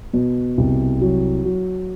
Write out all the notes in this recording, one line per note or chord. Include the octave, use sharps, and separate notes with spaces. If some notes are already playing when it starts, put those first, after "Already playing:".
B2
C2
F#3
F#3